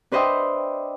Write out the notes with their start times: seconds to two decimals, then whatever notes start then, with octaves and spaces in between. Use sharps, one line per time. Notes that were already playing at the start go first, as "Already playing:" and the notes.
0.12 D4 B4 C5 D#5 E5 G5